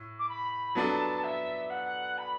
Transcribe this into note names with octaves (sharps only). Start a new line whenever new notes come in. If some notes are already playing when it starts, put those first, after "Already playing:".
Already playing: A2
D6
B5
F#3 B3 D4 A4 A5
E5
F#5
B5